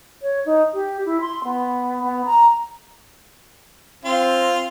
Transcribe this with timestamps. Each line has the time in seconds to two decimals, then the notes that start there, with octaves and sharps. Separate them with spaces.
0.22 C#5
0.46 D#4
0.74 G4
1.05 E4
1.21 C6
1.44 B3
2.03 B3
2.25 A#5
4.05 C4 F4